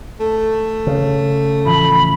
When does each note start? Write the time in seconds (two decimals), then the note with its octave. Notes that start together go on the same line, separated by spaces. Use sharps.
0.20 A3
0.87 C#3
1.66 A2 E3 F3 B5